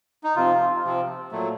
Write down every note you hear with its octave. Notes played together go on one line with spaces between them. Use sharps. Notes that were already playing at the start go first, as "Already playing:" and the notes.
D#4
C3 F3 C4 F4
C3 F3 C4
A#2 F#3 A3